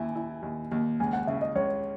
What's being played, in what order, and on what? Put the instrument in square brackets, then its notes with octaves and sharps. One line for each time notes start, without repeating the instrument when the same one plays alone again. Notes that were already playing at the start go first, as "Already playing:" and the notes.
Already playing: [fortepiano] D#2 E4 [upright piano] G#5
[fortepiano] E4
D#2
D#2
[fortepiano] C#2 [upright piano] G#5
[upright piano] F#5
[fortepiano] C#3 [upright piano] E5
[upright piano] D#5
[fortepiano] C#2 [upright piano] C#5